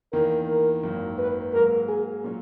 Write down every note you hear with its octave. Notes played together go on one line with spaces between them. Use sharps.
E2 D#3 A#3 A#4
A#4
G#1 F#2 D#3 A#3
B4
G#2 F#3 A#3 A#4
G#4
A#2 F#3 C#4